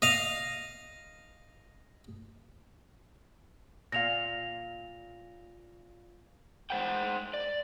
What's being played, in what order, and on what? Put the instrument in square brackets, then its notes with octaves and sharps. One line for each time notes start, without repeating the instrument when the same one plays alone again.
[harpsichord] D#5 F5
[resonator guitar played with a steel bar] A#2 F5 [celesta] A#6 F7
[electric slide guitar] G#3 C5 F#5 G5
D5